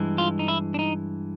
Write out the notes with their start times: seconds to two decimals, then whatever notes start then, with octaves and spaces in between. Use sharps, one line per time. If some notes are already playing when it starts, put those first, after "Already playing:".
Already playing: G2 E3 G#3
0.18 F4
0.39 D#4
0.48 E4
0.74 D4
0.79 D#4